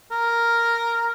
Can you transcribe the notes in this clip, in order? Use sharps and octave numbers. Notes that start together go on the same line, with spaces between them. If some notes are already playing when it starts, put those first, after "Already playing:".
A#4